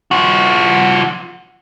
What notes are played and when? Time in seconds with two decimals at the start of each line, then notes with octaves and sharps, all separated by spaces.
0.11 F3 F#4